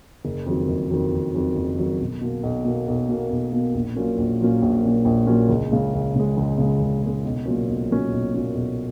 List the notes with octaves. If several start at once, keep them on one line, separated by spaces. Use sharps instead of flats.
F#1
F2 D#3 F#3
F#1
F2 D#3 F#3
F#1
F2 D#3 F#3
F#1
F2 D#3 F#3
B1
B2 A#3
B1
B2 A#3
B1
B2 A#3
B1
B2 A#3
A#1
A#2 F#3 A#3 C#4
A#1
A#2 F#3 A#3 C#4
A#1
A#2 F#3 A#3 C#4
A#1
A#2 F#3 A#3 C#4
C#2
C#3 G#3
C#2
C#3 G#3
C#2
C#3 G#3
C#2
C#3 G#3
B1
A#2 F#3 C#4
B1
A#2 F#3 C#4
B1
A#2 F#3 C#4
B1